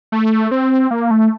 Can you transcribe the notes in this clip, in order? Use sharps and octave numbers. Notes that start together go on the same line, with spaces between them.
A3
C4
A#3
A3